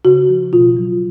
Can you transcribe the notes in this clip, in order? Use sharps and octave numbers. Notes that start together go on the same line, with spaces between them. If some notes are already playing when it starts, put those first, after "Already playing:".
C#3 F#4
F3
B2 F4
F#3